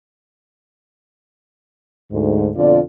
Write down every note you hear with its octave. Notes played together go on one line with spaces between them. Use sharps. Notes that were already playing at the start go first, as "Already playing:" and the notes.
D2 G#2
F2 B2 D3 F4 D5